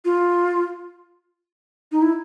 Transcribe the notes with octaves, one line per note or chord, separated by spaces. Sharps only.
F4
D#4
E4